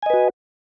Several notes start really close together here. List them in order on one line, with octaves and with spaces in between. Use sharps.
G#5 D#5 B4 F#4